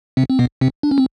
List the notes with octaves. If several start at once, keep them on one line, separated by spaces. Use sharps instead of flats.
C3 C4
C4
B2 B3
C3 C4
D4
C#4
C4